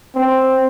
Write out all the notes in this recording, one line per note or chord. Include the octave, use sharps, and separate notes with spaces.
C4